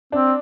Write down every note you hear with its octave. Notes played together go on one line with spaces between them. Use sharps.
C4 D4